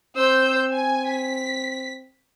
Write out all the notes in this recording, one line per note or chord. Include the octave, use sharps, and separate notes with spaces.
C4 C5 E6 G6
G#5
B6